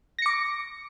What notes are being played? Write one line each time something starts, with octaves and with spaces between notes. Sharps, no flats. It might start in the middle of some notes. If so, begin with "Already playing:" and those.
D6 A#6 C#7